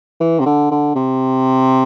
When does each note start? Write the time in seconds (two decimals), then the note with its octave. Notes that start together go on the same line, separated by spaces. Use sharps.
0.20 E3
0.40 C3
0.46 D3
0.71 D3
0.96 C3